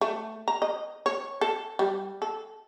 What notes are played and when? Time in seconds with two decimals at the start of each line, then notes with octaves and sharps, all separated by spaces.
0.01 A3
0.48 A#5
0.62 D#5
1.06 C#5
1.41 A4
1.79 G3
2.22 A4